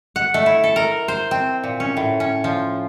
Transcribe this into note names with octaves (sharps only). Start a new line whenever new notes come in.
F#5
A3
E4
A4
A#4
C5
C4
A#2
C#4
A2
C#4
F3